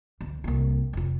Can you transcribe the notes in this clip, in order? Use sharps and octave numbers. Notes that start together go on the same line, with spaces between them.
D2 D3
C2 A#3
F1 F4